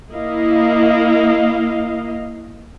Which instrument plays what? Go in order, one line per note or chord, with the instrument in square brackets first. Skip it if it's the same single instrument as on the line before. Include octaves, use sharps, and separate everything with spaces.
[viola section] A#3 E4 D#5 F5